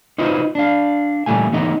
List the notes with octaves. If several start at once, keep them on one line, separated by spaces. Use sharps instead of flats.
D#4 F4 F#4 B4 C5 D#5
D4 F5
A#2 E3 G3 A3 G#5
E3 A3 B3 D#4 D#5